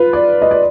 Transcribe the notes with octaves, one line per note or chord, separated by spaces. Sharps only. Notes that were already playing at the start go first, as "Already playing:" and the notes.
Already playing: F4 B4
D5
D#5
D5